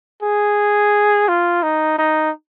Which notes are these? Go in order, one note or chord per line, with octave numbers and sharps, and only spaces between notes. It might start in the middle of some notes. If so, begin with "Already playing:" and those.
G#4
F4
D#4
D#4